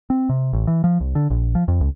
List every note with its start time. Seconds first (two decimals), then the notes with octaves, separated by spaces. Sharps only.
0.10 C4
0.29 C3
0.53 A1
0.67 E3
0.84 F3
1.00 C2
1.15 D3
1.30 A#1
1.55 F3
1.68 F2
1.81 C#2